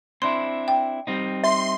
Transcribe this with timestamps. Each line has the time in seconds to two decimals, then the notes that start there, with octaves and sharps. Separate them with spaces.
0.22 C4 D4 E4 C6
0.68 G5
1.07 G3 C4 D#4
1.44 E5 C6